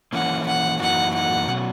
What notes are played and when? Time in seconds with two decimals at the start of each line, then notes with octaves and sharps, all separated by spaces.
0.13 E3 A#3 C#4 F#5
0.46 F#5
0.80 F#2 E3 A#3 D#4 F#4 F#5
1.14 F#5
1.48 B2 F#3 C#4